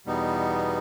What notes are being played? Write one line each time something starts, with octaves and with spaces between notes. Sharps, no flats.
E2 B2 G3 B3 D#4